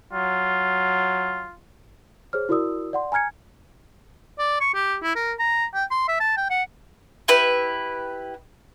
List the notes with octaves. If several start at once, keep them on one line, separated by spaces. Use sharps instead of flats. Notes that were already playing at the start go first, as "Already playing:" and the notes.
F#3 F4
G#4 C5 C#5 F6
E4 F#4 A#4 D5 D#6 E6
D5 F#5 C6
G#5 A#5 F6 G#6 C#7
D5
C#6
G4
E4
A#4
A#5
G5
C6
E5
A5
G5
F#5
E4 G4 B4